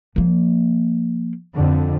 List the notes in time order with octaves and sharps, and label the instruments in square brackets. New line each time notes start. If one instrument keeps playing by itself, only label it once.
[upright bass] F3 A#3
[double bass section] F2 D3